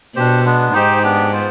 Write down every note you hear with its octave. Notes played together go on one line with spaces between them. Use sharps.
B2 D4 G4 C5
G#3 B3 D4
G#2 D#4 G4 C5
B3 D4 G4
B3 F4 C5